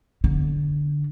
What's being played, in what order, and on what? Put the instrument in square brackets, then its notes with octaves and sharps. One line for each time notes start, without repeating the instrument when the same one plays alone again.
[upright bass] D3